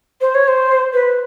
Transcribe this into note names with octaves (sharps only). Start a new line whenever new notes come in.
C5
C#5
C5
B4